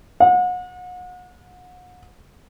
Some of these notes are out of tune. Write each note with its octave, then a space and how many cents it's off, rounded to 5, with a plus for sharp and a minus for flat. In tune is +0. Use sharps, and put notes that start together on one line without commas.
F#5 -35